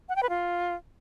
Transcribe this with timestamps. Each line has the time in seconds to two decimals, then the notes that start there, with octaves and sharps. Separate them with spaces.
0.09 F#5
0.16 G5
0.23 B4
0.30 F4